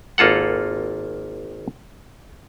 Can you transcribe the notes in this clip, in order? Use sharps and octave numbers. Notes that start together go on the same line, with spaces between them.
G#1 A#3 F4 A4 F#5